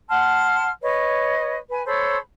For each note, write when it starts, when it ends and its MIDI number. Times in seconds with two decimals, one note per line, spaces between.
0.08 0.68 78
0.08 0.68 81
0.08 0.68 84
0.08 0.68 89
0.81 1.57 71
0.81 1.57 73
0.81 1.57 75
1.69 1.80 71
1.69 1.80 80
1.85 2.16 69
1.85 2.16 72
1.85 2.16 73
1.85 2.16 83